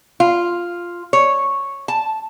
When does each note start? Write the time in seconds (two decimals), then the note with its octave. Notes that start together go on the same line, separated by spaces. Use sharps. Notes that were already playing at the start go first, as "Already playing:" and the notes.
0.20 F4
1.13 C#5
1.88 A5